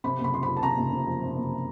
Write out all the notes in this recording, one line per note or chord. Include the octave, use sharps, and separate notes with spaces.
C3 B5
F#1
B5
F2 C6
B5
F3
A5
C3 A#5
F#1
F2
F3
C3
F#1